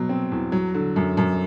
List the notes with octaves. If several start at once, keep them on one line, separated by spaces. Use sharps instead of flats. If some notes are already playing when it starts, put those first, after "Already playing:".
Already playing: B2 F#3
C4
E2
F#3
D3
F#2
F#2